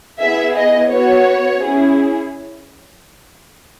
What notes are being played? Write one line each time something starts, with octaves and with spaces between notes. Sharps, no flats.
B3 E4 G#4 E5
D#5
B3 F#4 C#5
C#4 E4 G#4